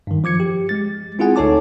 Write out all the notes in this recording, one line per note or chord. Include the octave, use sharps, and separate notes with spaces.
G2 D#3
F3 D6 G#6 C#7
G4
G#3 A6
C4 E4 F4 G#4 F#5 G#5
D2 D#4 A4 C#5 A5 D6